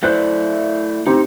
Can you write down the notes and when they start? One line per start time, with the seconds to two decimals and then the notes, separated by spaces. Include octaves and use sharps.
0.03 A3 E4 C5 D5 F#6 G6
1.06 C4 D#4 G4